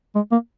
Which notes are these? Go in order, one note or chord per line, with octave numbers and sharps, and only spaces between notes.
G#3
A#3